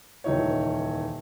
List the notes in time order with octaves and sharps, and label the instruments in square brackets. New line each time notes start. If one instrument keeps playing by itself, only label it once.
[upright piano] D#1 C#2 E3 D#4 E4 C#5